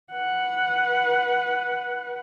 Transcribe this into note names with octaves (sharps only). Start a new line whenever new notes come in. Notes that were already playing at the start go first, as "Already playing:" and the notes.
B4 F#5